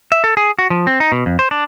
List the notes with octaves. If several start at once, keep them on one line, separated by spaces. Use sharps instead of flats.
E5
A4
G#4
F#4
F3
C4
D#4
B2
F2
C5
D4